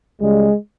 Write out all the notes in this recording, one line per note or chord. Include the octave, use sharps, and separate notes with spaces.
C#2 C#3 G3 G#3